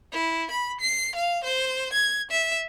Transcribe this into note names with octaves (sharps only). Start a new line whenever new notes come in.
E4
B5
C7
F5
C5
G#6
E5